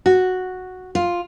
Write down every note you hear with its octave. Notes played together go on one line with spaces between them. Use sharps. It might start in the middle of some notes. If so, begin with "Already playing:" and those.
F#4
F4